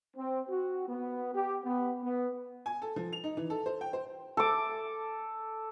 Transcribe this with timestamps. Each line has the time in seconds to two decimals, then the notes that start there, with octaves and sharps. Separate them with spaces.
0.16 C4
0.49 F#4
0.88 B3
1.34 G4
1.63 B3
2.03 B3
2.66 G#5
2.82 A4
2.96 F3
3.13 F7
3.24 D#4
3.37 E3
3.50 A4
3.66 C5
3.81 G5
3.93 C5
4.37 A4 D6